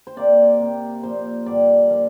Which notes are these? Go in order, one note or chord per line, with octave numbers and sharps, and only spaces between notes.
C5
C3 A#3 D5
C3 A#3
A#2 F3 A#3 C5
G2 D3 G3 D5
A#2 F3 A#3